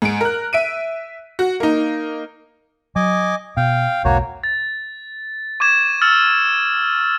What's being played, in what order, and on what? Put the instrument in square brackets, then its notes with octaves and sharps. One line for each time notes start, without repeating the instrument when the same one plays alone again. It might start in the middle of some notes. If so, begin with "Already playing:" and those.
[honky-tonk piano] G#2 D7
A#4 F#6
E5 D7 D#7
F#4
A#3 D#4
[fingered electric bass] F#3 [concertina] D#5 G#5 D6
[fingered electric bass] B2 [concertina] F5 G5
[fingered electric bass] B1 E2 G#2 [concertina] A#3 F#4 C#5
[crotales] A6
C#6 D6 G#6 E7
E6 F6 A6